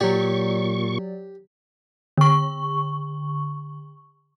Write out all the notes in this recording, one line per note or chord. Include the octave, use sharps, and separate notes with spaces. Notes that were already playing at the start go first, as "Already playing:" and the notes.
A#2 F#3 G4 D5 C#6
D3 C#6